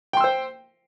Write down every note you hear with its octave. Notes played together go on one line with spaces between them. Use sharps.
C5 G5 C6 E6